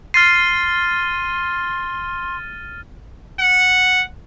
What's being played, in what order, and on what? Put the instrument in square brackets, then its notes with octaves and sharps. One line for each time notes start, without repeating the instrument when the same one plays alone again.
[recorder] C6 [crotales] F6 A6 D#7 [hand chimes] C7
[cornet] F#5